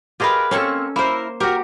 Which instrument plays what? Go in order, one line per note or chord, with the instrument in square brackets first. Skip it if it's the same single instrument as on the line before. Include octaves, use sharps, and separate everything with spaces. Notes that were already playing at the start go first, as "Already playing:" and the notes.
[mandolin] F4 A#4 B4 [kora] G4 G#4 D#5
[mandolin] A#3 C4 C#6 [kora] C#4 A4
[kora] A#3 C5 [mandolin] E4 A#4
[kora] F#4 G4 [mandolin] A#4